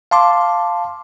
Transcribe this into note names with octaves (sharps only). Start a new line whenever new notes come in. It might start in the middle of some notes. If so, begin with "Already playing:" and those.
F5 A5 C6 D6